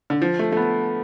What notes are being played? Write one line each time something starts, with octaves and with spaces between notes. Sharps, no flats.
D3
F3
A3
A3
B3